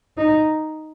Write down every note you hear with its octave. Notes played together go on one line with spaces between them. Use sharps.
D#4